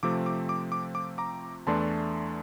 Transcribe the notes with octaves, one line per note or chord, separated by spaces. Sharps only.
C3 F3 A3 C4 D6
D6
D6
D6
D6
A#5 D6
E2 E3 A3 D4 A5 C6